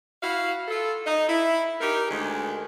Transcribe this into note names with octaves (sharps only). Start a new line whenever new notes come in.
E4 F#4 F5
F4 A4
D#4 D#5
E4
D#4 G4 A#4
D2 D#3 G#3 G#4